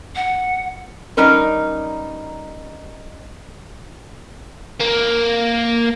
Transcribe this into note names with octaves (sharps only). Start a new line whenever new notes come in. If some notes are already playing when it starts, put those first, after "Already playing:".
F#5
G3 C#4 D#4 A#4 B4
A#3